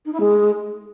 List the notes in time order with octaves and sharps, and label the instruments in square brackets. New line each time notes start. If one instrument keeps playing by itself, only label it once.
[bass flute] D#4
E4
G#3